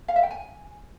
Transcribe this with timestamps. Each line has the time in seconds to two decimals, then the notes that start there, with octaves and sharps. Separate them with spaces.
0.08 F5
0.16 E5
0.23 G5
0.31 G#5